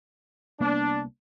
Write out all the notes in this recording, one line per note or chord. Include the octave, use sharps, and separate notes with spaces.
C2 A#3 B3 D4